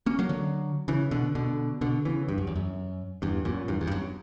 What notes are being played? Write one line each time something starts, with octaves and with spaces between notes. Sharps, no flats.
A#3 C#4
F#3 A#3
D3 F#3
C#3 E3
B2 D3
B2 D3
B2 D3
C#3 E3
G2
F#2
E2
F#2
E2 G2
F#2 A#2
E2 G2
E2
G2
F#2